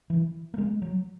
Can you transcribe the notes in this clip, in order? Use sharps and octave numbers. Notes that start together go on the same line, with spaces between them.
E3
A#3
G#3
F#3